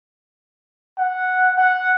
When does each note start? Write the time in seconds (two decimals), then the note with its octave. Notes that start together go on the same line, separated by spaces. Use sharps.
0.98 F#5
1.58 F#5